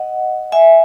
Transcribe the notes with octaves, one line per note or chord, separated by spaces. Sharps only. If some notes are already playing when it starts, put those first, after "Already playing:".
Already playing: D#5 F#5
E5 G#5